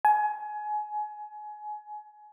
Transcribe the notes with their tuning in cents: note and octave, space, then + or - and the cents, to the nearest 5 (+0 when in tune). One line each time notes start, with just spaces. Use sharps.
G#5 +25